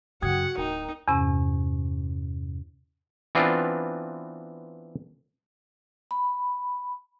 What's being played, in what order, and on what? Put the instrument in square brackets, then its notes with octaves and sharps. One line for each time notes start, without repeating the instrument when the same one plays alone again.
[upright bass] F#2 C#3 [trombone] F#4 [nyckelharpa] F#5 [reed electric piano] G5 D#6 G#6
[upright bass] D1 [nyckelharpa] D#4 [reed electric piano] A#4 G5 A#5
[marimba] E2 G2 C3 C#4
[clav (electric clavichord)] E3 B3 C4 D4 F4
[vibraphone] B5